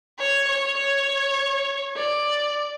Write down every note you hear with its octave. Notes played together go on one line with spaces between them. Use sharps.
C#5
C#5
C#5
D5